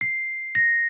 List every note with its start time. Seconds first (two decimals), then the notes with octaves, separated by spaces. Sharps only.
0.01 C7
0.55 A#6